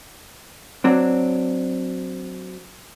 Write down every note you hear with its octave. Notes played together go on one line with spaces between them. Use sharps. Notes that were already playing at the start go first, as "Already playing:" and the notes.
F#3 C4 D4